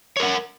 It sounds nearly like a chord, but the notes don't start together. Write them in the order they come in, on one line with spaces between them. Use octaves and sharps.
C#5 A#4 F#5